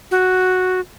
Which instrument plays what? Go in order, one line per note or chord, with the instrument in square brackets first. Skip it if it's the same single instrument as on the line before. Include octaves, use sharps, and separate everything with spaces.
[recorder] F#4